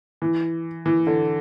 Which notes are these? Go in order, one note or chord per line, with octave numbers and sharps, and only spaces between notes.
E3
E3
D3